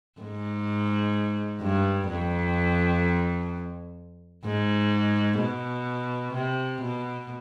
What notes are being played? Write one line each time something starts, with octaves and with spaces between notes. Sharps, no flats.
G#2
G2
F2
G#2
B2
C3
B2